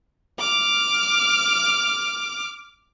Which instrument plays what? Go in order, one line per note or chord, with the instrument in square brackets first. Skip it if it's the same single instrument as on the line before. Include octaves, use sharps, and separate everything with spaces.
[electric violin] D6 F6